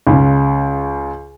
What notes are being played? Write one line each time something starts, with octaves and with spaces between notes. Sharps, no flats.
C#2 C#3